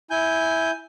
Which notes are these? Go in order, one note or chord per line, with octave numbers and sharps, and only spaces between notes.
E4 G#5 G6